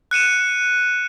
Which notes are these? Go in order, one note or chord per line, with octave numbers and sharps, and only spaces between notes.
F#6 C#7 D#7 E7